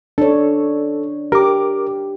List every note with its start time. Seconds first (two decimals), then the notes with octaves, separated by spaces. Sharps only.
0.18 D4 A4 C#5
1.32 G4 A#4 D6